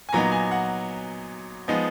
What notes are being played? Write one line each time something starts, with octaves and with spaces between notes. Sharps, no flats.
G#5
A#2 F#3 B3 D#4 A#5
G#5
F#5
F3 G#3 B3 D#4